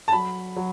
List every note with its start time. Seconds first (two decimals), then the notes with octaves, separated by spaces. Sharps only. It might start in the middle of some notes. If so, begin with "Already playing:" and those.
0.08 A5
0.12 F#3 B5
0.56 F#3